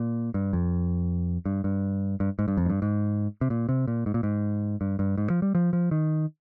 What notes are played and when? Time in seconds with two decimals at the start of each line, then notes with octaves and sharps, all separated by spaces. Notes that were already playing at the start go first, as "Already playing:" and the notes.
Already playing: A#2
0.34 G2
0.53 F2
1.45 G2
1.64 G2
2.20 G2
2.39 G#2
2.48 G2
2.57 F2
2.66 G#2
2.70 G2
2.82 G#2
3.41 C3
3.50 A#2
3.69 C3
3.87 A#2
4.06 G#2
4.14 A#2
4.23 G#2
4.81 G2
4.99 G2
5.18 G#2
5.30 F3
5.42 G3
5.55 F3
5.73 F3
5.91 D#3